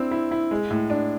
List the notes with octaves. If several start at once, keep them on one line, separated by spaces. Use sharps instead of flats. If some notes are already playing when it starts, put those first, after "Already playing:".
Already playing: C4 D4 E4
E4
E4
G#3
A2
D4